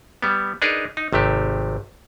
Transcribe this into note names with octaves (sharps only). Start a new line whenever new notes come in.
G3 B3
D4 D#4 G#4 A#4 B4
D#4
G#1 C3 A3 G4